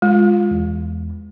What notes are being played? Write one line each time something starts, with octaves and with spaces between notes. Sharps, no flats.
G#3 F4
E2